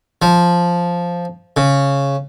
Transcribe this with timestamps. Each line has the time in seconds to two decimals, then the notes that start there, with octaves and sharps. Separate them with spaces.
0.22 F3
1.57 C#3